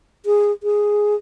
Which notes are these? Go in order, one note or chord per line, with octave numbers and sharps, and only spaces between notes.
G#4
G#4